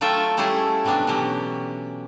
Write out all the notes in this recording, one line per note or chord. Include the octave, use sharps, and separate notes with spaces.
F#3 A3 F4 A4 E5 G5
G3 A3 C#4 E4 G#4 A4
C3 F#3 G3 B3 D4
B2 E3 F#3 C#4 G4